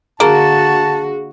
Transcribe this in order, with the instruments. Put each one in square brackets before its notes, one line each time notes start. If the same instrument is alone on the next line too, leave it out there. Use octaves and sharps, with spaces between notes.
[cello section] D3 F#4 [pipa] A#3 [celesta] G#4 [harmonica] A5